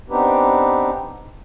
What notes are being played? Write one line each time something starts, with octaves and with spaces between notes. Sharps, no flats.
B3 C4 D4 D#4 G4 B4